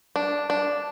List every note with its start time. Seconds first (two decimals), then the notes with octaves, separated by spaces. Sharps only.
0.16 D4
0.50 D4